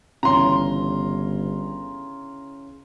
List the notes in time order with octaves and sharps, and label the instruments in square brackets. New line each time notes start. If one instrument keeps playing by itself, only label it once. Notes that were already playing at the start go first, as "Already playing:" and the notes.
[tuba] G1 [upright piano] C#3 E3 C#4 [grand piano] A#5 C6